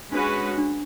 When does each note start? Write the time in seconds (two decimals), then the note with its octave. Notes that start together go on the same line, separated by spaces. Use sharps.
0.12 G#3 C#4 D4 F#4 B4
0.58 D4